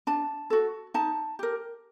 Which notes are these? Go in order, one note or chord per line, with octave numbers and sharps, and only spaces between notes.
D4 A5
F#4 A4
D#4 A5
G4 A#4